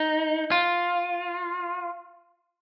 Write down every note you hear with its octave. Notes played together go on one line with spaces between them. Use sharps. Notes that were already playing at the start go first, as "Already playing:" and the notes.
Already playing: D#4
F4